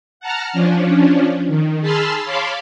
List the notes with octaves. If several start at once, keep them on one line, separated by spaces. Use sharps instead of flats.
F#5 A5 A#5 F6
F3 C#4 D4
D#3
G#4 A5 B5 C6 E6 F6
C#5 F5 A5 B5 C6 D6